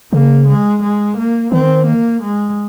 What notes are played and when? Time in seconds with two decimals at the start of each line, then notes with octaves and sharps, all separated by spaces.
0.12 C#3 A#3
0.47 G#3
0.82 G#3
1.17 A#3
1.52 D#3 C4
1.86 A#3
2.22 G#3